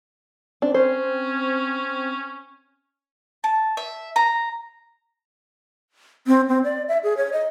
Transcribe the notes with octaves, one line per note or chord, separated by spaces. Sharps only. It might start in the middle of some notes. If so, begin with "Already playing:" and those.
C4 D4
C#4 C5
A5
E5
A#5
C4
C4
D5
E5
G#4
C#5
D#5